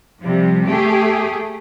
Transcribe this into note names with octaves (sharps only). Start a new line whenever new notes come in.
C3 F3 G3
A3 G4 G#4